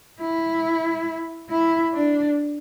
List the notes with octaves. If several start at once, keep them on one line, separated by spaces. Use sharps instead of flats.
E4
E4
D4